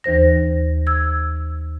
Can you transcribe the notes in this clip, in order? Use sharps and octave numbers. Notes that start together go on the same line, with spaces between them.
D#2 E3 C5 A#6
E6 G#6